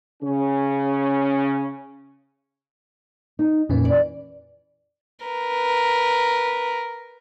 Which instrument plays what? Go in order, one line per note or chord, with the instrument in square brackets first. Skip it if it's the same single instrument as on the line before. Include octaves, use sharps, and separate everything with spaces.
[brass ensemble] C#3 C#4
[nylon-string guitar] D#4
[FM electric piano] F2 A#2 C#4 [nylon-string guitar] E3
[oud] D5
[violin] A#4 B4